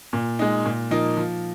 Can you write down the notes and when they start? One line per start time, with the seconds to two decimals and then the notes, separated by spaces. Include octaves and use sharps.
0.13 A#2
0.39 G#3 D#4
0.65 A#2
0.91 F3 A#3 D#4
1.17 F3